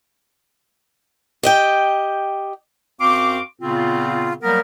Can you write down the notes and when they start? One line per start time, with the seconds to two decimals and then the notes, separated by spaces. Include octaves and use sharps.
1.43 G4 D#5 G5
3.00 F#2 C4 F#4 F5 C6 D6
3.61 A#2 C#3 B3 C4 F4
4.42 F#3 G3 A#3 B3 A#4